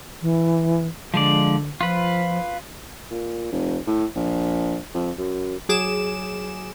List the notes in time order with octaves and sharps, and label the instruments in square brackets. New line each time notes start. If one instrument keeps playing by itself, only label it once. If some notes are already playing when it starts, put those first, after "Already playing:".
[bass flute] E3
[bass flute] D3 [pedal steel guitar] F3 G#3 D5
[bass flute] F3 [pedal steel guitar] F4 B4
[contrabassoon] A#2
F1
A2
A#1
F2
F#2
[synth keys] F#3 G#4 D6 E7